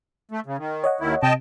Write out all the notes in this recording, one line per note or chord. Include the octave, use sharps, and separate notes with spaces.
A3
C#3
D#3
C#5 D#5 F#5
D#2 D#3 E4
C3 D#5 G5 A5